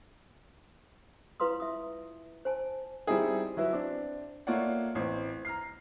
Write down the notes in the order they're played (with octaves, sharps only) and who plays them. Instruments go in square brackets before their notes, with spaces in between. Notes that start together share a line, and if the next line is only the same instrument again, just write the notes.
[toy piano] E4 F4 B4 F5 C6 D#6
E5 D#6
C5 G#5 A5
[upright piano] G3 C4 D#4 E4 G#4
F#3 E4 B4 E5
C4 D4
A3 A#3 F4 C#5 D5 F#5
A1 C4
A#5 F6 C7